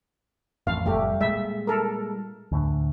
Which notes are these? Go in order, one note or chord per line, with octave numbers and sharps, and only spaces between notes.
A1 F2 F5
F1 A2 G3 A3 G4
A#2 G3 G#3 E5
A4 A#4
D2 A2 D3